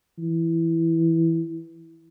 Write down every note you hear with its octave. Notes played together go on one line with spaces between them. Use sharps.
E3